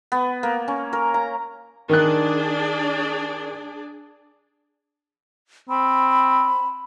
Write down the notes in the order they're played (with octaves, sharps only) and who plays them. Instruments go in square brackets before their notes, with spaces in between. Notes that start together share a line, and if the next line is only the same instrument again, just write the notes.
[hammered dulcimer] B3
A#3
C#4
A#4
A#5
[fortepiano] D#3 F#6 [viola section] D4 G#4 D5
[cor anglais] C4 [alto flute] B5